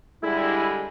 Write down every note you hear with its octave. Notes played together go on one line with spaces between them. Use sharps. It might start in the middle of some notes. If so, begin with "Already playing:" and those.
D3 G3 G#3 E4